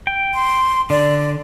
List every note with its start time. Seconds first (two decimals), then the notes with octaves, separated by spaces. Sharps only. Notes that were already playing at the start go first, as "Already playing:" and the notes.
0.07 G5
0.34 C6
0.90 D3 D5